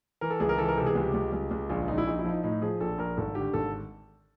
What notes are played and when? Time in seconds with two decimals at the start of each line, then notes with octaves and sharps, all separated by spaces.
0.21 E3 A#4
0.31 A4
0.40 C#2 G#4
0.49 A#4
0.58 E3 A4
0.68 A#4
0.77 C3 A4
0.86 G#4
0.95 C#2 G4
1.14 C#2
1.33 C#2
1.51 C#2
1.69 A#1 F4
1.88 A#1 D#4
1.98 E4
2.07 A#1 D#4
2.19 E4
2.24 F3 D#4
2.43 A2 D#4
2.62 F3 G#4
2.80 A#1 A4
2.98 A#1 A#4
3.17 G#1 A4
3.35 D3 G4
3.54 G#1 A4